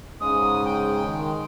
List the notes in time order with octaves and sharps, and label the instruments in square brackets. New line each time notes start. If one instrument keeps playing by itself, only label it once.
[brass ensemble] G#2 C#3 [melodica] G#3 [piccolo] D#6
[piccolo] G5
[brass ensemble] D#3